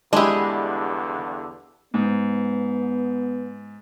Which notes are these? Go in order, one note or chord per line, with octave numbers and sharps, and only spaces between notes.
E2 G2 D3 G#3 D4 E4 G4 D#5
G#2 B3